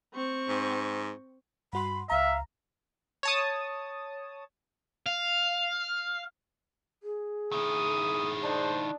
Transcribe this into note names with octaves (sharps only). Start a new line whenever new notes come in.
C4 C#6
G#2
G2 F#4 B5 C6
C#2 E5 F5 A#5
C#5 A5 D#6
F5
G#4
D#3 E4 D#6
D4 D#4 C5 A5